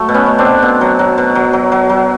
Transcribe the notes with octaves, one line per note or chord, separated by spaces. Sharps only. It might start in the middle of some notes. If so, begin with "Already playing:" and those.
Already playing: F#3 A3
B2
B3 C#4
B2
C4 D4
B2
B2
F#3
F#3
B2
F#3
F#3
F#3
F#3